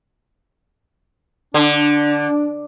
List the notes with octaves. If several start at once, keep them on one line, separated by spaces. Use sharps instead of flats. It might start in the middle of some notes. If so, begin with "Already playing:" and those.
D3 D4